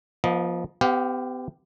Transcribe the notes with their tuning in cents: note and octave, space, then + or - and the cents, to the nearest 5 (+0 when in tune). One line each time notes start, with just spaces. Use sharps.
F3 +0 B3 -45 D#5 +0
B3 +45 G4 +0 F5 +20